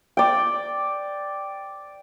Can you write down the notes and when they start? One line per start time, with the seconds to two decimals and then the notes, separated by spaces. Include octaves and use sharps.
0.17 D5 G5